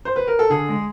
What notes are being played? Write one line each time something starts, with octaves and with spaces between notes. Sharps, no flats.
C5
B4
A#4
A4
D3 G#4
G#3